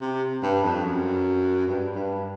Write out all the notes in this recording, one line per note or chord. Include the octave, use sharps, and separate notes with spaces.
C3
G2
F2
F#2
G2
G2